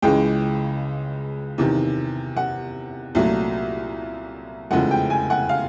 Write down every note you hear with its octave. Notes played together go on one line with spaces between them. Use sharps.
C#2 C#3 E3 G#3 G5
E2 C3 D#3
F#5
C2 A#2 F#3 A3
F1 E2 C#3 F3 G#3 F#5
G5
G#5
F#5
F5